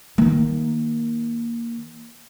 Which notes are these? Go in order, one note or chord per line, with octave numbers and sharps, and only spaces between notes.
D#3 A#3